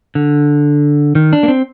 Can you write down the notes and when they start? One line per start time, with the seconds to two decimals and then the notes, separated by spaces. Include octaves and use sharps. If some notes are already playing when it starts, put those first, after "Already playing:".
0.15 D3
1.15 D#3
1.33 D4
1.43 A#3
1.48 C4